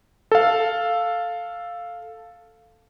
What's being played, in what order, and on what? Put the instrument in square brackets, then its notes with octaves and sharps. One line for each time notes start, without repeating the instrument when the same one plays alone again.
[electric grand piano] A4 F5